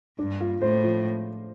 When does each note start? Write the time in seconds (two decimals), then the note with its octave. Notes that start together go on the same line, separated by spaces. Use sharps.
0.19 G2 D4
0.40 F4
0.61 A2 C5
0.84 F3